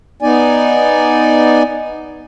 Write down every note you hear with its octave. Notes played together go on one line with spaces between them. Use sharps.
B3 D#4 D5 G#5